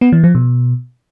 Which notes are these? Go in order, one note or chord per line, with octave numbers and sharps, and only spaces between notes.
B3
E3
F3
B2